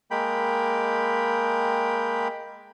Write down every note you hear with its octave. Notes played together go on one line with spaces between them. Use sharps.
G#3 A#3 G5 B5